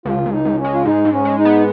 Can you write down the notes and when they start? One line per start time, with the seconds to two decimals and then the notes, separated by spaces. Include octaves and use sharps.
0.05 C#2 F4
0.26 C#2
0.32 D#4
0.45 C#2
0.58 C#4
0.64 G#3
0.74 F4
0.85 G#2 D#4
1.05 G#2
1.12 C#4
1.25 G#3
1.38 D#4
1.45 B3